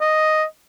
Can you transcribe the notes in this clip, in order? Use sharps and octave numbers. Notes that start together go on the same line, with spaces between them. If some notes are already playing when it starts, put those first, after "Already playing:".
D#5